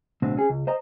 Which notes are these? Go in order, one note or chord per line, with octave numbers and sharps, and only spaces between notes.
B1 A2 D3 C4
C#4 G#4
C#2
C5 D#5 A#5